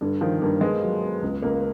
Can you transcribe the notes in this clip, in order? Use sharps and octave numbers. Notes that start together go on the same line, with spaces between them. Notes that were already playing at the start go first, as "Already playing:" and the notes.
G2 D3
D#3 F3
G2 A#3
G#3 B3
F#3
B3
C#2
C#2 A#3